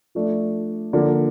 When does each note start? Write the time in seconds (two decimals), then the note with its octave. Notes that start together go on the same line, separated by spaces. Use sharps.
0.15 F3 A3 D4
0.93 D3 F3 A#3 D4